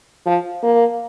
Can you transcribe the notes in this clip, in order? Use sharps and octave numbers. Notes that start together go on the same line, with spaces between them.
F3
A#3